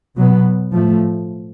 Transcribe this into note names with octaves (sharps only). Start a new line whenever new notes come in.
B2 F#3 B3
A2 F3 A3